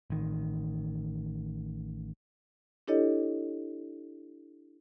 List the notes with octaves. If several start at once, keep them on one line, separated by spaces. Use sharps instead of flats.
A1 D#3
D4 E4 G4 A4 C#5 D#5